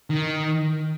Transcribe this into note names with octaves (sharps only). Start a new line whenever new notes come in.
D#3